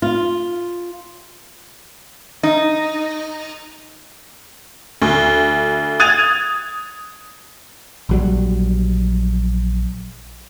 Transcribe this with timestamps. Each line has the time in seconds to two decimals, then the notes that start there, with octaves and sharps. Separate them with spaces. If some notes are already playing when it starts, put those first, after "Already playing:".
0.02 F4
2.43 D#4
5.02 D2
6.00 D#6 F#6 G#6 A6 D#7 F7
8.09 A#1 F#3 G3